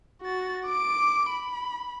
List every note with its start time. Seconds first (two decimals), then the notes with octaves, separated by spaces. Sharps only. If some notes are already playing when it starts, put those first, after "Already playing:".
0.22 F#4 A6
0.66 D6 D7
1.30 B5